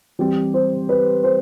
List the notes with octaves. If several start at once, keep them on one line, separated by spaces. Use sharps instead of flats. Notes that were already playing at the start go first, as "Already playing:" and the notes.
E3 G3 C4 G4
C5
B4
C5